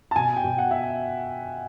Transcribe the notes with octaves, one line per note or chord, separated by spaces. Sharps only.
A5
B2 G#5
G5
B2
F#5
E5